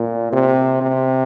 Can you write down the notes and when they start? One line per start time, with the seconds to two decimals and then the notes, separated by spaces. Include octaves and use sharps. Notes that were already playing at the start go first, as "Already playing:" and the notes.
Already playing: A#2
0.32 C3
0.82 C3